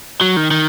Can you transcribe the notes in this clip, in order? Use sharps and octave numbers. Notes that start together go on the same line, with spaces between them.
F#3
D#3
D#3